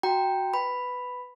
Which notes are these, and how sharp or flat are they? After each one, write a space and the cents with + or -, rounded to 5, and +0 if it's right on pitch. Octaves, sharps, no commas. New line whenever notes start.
F#4 +0 G5 +0 A#5 +0
B4 +10 B5 +0